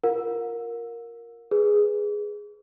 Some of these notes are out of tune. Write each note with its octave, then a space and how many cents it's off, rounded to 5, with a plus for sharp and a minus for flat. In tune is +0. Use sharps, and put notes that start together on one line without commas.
F4 +0 A#4 +0 F#5 -45
G#4 +0 B4 +0